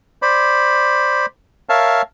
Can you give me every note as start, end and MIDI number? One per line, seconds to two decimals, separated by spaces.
0.22 1.26 72
0.22 1.26 74
0.22 1.26 83
1.69 2.02 70
1.69 2.02 73
1.69 2.02 76
1.69 2.02 77
1.69 2.02 81